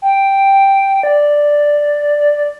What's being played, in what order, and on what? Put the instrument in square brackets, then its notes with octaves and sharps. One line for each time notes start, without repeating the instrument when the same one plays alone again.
[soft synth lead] G5
D5